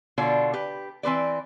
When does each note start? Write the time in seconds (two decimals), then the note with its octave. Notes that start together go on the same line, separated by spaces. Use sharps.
0.18 B2 D3 F4 C#5 D5
0.53 G4 B4
1.03 E3 C4 B4 D5